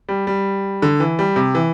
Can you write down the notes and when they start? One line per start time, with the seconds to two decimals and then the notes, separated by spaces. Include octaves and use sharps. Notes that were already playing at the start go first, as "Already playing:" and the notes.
0.09 G3
0.27 G3
0.82 D3
1.00 E3
1.19 G3
1.36 C3
1.55 E3